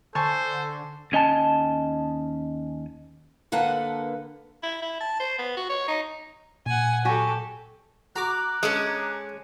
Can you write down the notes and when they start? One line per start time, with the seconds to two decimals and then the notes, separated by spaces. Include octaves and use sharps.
0.15 D3 A4 C5 G#5 A5 C#6
1.12 D#2 C#4 D#5 G#5 A5
3.52 D3 A#3 A4 B4 F#5
4.63 E4
4.82 E4
5.01 A5
5.20 C5
5.39 B3
5.57 F#4
5.70 C#5
5.88 D#4
6.66 A#2 F#5 G#5
7.05 F#3 F#4 G4 A4 G#5
8.16 F#4 A#5 D6 F#6
8.63 G#3 C#4 A4